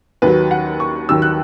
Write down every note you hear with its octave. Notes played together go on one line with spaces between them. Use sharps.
D#2 D#3 F#3 B4
F#5
C#6
D#2 D#3 F#3 E6
F#6